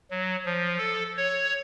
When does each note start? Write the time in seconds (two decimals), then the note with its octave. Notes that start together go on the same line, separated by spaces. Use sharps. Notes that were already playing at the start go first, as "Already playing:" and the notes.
0.11 F#3
0.45 F3
0.78 A4
1.17 C#5